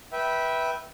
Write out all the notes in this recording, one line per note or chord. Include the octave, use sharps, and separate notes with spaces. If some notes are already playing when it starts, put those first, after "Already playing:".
B4 E5 G5